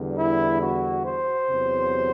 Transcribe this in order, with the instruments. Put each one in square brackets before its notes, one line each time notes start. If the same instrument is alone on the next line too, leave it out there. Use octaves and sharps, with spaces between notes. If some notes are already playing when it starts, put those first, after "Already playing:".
Already playing: [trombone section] E2 D3 G3
E4
F#4
C5
E2 C3 F#3